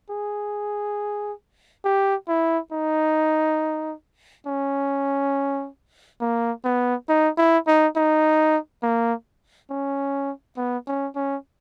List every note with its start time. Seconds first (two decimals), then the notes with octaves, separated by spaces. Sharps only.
0.10 G#4
1.85 G4
2.28 E4
2.72 D#4
4.46 C#4
6.21 A#3
6.64 B3
7.09 D#4
7.38 E4
7.67 D#4
7.96 D#4
8.83 A#3
9.70 C#4
10.57 B3
10.87 C#4
11.16 C#4